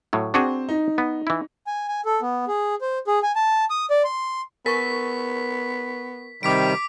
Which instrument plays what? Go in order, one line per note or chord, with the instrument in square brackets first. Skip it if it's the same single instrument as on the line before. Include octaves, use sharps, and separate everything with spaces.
[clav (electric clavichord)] A2 F#3
[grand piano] C4 [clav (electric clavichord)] D4 F#4 G#4
[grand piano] D#4
[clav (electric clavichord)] B3
E3 E4
[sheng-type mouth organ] G#5
G#5
A4
B3
G#4
C5
G#4
G#5
A5
D#6
D5
C6
[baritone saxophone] B3 [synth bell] A#4 C#6 [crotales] B6
[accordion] C3 D#3 G3 [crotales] D6 B6 D7